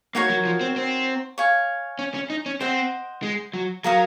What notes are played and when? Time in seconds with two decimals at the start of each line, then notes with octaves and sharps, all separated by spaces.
0.15 A#3 D#4 F#4 A#4 C#5
0.30 F#3
0.45 F3
0.61 C4
0.76 C4
1.38 C#5 F5 G#5
1.99 C#4
2.14 C#4
2.30 D#4
2.46 C#4
2.60 C4 C5 D#5 F#5
3.23 G#3
3.53 F#3
3.84 F#3 A#4 F5 A#5 D#6